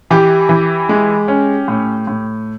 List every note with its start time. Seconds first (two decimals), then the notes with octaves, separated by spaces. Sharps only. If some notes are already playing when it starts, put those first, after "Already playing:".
0.11 E3 G4
0.49 E3
0.89 G#3
1.28 C#4
1.68 A2
2.07 A2